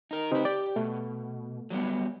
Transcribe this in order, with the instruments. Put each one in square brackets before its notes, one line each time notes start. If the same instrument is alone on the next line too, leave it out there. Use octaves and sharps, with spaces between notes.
[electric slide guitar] D#4 A#4
[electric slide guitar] C#3 B4 [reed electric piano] C4 D#4 G4
[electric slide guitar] G4 [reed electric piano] D5
[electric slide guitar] B2 [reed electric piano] A3
[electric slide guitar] F#3 G3 B3